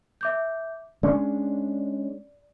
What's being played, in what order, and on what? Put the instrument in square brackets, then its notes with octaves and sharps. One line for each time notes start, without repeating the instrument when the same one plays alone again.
[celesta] E5 D6 G6
[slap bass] G#3 C#4 D4 [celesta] D5